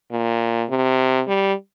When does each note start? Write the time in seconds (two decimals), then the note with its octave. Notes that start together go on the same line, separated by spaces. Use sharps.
0.12 A#2
0.70 C3
1.28 G3